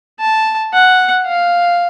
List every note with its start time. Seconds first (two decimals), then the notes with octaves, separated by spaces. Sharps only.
0.20 A5
0.73 F#5
1.27 F5